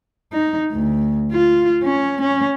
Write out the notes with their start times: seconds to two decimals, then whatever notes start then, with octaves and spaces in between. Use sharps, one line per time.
0.33 D#4
0.72 D2
1.32 F4
1.83 C#4
2.22 C#4